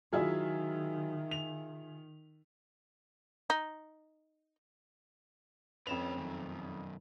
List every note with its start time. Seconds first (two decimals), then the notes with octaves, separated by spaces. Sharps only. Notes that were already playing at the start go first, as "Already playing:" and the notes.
0.12 D#3 F#3 E4 F4 G#4 E5
1.31 F7
3.50 D#4
5.87 F2 C#4 B4 E7 F7
6.18 F#2 D#3